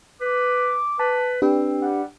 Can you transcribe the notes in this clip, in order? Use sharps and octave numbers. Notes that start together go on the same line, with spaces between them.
B4 D6
B4 A5
C4 D4 G4 B4
G3 F#5